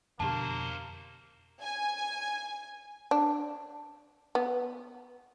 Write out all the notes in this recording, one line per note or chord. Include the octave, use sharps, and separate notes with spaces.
F2 B2 D3 A#3 D4 G4 C5 A5
G#5
D4
B3